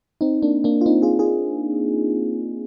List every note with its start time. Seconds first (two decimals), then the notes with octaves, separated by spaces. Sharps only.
0.21 C4 D#4
0.42 A#3 D4
0.64 A#3 D4
0.81 F4
0.86 C4 D#4
1.02 F4 G#4
1.19 F4 G#4